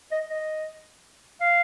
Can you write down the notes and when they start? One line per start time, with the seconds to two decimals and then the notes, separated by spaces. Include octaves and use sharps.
0.12 D#5
0.30 D#5
1.40 F5